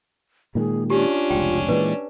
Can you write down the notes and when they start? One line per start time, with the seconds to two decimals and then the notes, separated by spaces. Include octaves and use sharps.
0.55 A#2 D#3 G#3 G#4
0.90 C#4 D4 F4 G4
1.30 F1 C#2 G5
1.68 A#2 E3 G#3 B4 D5